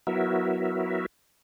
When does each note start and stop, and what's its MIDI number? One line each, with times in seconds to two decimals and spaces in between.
0.07 1.06 54
0.07 1.06 59
0.07 1.06 64
0.07 1.06 66
0.07 1.06 70
0.07 1.06 76